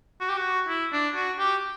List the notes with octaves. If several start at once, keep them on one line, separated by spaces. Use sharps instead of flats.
F#4
G4
F#4
E4
D4
F#4
G4